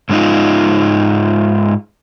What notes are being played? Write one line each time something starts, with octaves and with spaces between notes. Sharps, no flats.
G#2 G#3 C#4 D#4 F4